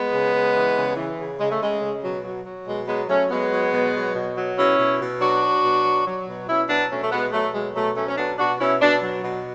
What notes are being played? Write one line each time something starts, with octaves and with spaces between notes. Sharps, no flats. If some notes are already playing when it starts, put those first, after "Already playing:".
Already playing: G#3 B3
C#3
C#3
E3
C#3
E3
C#3
C#3 G#3
A3
C#3 G#3
C#3
B2 F#3
F#3
F#3
B2 G#3
F#3 G#3 B3
F#3 A3 C#4
F#3 G#3 B3
F#3
B2
F#3
B2
F#3
B2 C#4 E4
B2
B2
F#3 D4 F#4
F#3
B2
F#3
F#3
B2
B2 C#4 E4
F#3 B3 D4
B2 A3 C#4
A3
B2 G#3 B3
B2 F#3 A3
F#3 G#3
B2 F#3 A3
F#3 A3 C#4
C#4
B2 B3 D4
B2 D4 F#4
B2 C#4 E4
B2 B3 D4
F#3
B2